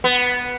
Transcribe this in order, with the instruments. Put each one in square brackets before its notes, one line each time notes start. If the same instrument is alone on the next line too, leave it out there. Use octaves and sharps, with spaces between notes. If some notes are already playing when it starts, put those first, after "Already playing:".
[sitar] B3